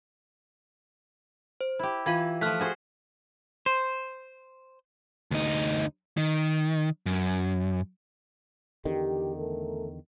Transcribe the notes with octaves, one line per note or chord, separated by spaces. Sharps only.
C5
E4 G4
E3 F4 F5 G#6
F3 A3 F6 F#6 B6
F#4 G#4 C5
C5
D2 D#4
D#3
F#2
E2 D3 D#3 G4
A3 A4 A#4